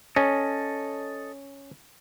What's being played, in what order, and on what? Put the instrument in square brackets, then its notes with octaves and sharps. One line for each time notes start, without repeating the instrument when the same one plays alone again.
[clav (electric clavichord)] C#4 [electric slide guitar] A4 D#5